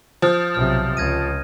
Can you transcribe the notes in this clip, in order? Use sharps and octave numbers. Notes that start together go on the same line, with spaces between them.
F3 C5 D#6 F6 G6
B1 C3 F6
C#2 G#6 A#6 D#7